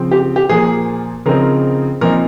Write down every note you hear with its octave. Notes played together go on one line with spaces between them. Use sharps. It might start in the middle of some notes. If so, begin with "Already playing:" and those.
Already playing: C#3 F3 C4
G4
G4
A#2 F3 A#3 G#4
C#3 F3 C4 D#4 A#4
A#2 F3 C4 D#4 A#4